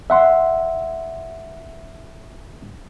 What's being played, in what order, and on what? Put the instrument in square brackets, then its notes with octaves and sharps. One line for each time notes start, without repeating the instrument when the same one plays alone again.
[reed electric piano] E5 F#5 C6